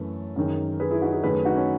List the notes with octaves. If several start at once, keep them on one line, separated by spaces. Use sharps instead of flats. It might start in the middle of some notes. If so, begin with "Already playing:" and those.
Already playing: F#2 E3 A3 A4 B4
F#2 D#3 G#3
G#4 B4
E4 G#4
D#4 F#4
E4 G#4
F#2 D#3 A3 G#4 B4
D#4 F#4
C#4